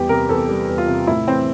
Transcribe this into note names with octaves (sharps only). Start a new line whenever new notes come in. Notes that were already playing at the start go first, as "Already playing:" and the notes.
Already playing: E2 G3 G4
C3 A#4
E2 A4
G3
E2
F4
C3
A2 E4
E3 C4